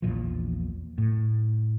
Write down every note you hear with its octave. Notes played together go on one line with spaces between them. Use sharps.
A#1 E2 A#2 F3
A2